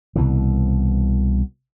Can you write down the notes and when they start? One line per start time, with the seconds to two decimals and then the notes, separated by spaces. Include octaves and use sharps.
0.16 C2 B2 E3